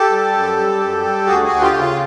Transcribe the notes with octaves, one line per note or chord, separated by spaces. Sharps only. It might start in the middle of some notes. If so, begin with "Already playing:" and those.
Already playing: G4 A4
G3
F#2
G3
F#2
G3
D2 F#4 G#4
F#4 G#4
D2
F4 G4
C#3
F4